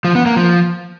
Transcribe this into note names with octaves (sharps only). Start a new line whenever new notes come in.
F3
B3
A#3
F3